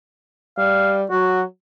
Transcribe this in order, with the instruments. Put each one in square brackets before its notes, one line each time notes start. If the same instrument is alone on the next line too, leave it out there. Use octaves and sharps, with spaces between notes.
[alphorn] G3 [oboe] F5
[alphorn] F#3 [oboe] F#4